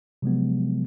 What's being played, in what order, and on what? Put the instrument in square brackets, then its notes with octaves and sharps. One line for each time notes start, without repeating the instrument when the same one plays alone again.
[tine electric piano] C3 F3 F#3 G#3 B3